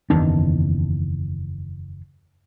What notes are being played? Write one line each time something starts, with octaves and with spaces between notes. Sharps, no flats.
F#1 E2 D#3 D4